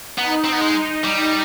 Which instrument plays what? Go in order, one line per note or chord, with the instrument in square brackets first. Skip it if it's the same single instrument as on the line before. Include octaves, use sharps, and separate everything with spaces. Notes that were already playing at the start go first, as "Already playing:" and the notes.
[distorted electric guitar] B3 [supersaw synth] D#4
[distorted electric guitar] C4
B3
G#3
G3